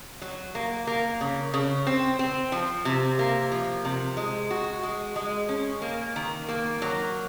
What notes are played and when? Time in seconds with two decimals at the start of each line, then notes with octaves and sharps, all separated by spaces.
0.22 F#3
0.55 A#3
0.87 A#3
1.21 C#3
1.54 C#3
1.87 C4
2.19 C4
2.52 F3
2.85 C3
3.19 A#3
3.52 F3
3.85 C3
4.17 G#3
4.51 F#4
4.83 G#3
5.16 G#3
5.49 C#4
5.82 A#3
6.16 D#3
6.49 A#3
6.82 F#3